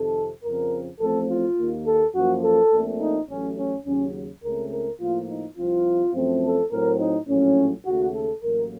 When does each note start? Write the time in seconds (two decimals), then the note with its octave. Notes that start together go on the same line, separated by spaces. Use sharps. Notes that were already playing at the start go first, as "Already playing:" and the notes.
Already playing: F2 C3 D#3 A4
0.43 F2 C#3 F3 C4 A#4
1.00 A1 A2 F3 A3 C4 A4
1.29 F4
1.57 D#2 D#3 A#3
1.86 A4
2.14 F#2 F3 A#3 F#4
2.43 A4
2.72 A#1 A#2 A3 C4
3.00 D#4
3.29 A1 A2 F#3 A3 C#4
3.57 C#4
3.85 D#2 C#3 F#3 C#4
4.42 C#2 C#3 A3 C4 A#4
4.71 A#4
5.00 A2 F3 A#3 F4
5.28 D#4
5.57 C2 C3 F3 C4 F4
6.13 F#2 F3 A3 C4
6.43 A4
6.71 A2 F#3 C4 A#4
6.99 D#4
7.28 A#1 A2 F#3 C#4
7.85 D#2 C#3 A3 F#4
8.14 A4
8.42 A1 A2 F#3 A#3 A#4